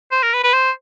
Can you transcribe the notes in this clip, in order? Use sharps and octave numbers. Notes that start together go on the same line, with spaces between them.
C5
A#4
B4
B4
C5